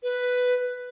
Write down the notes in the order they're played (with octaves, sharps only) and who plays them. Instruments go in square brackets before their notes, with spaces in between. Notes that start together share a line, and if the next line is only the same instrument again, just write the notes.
[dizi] B4